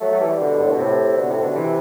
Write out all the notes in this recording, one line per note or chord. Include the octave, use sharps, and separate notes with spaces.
F#3 A3
A3
E3 G3
B2 D3
G2
A2
B2
A2 C3
B2 D3
A2 C3
B2 D3
C3 E3